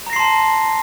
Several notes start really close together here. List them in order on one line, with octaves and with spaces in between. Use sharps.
A#5 A#6 C7 C6 A5